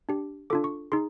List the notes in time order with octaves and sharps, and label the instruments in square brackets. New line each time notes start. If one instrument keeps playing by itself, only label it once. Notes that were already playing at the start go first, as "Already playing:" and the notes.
[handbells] D4 G4
D4 F4 A4 D6
C#6
D#4 G#4 C6